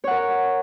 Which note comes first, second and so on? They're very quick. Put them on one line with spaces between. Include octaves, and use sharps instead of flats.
C#5 F#5 A#4